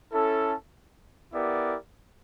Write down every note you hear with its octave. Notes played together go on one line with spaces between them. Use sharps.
C#4 E4 A4
B3 E4 G4 A#4 D5